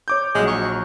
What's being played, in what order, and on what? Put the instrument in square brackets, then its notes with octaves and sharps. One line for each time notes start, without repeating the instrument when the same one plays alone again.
[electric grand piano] C#5 D6 G6
[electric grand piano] A#1 F#3 [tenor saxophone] G#3
[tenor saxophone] C#5